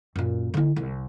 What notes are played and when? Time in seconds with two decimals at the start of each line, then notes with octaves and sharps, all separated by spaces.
0.16 F#2 A#2
0.54 D3 E4
0.76 C2